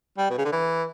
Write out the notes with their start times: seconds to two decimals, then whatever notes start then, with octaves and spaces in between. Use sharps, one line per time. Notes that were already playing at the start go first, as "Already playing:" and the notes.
0.18 G3
0.30 B2
0.38 C#3
0.45 D3
0.52 E3